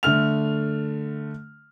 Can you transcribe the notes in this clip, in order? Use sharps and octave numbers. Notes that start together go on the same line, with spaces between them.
D3 A3 F6 F7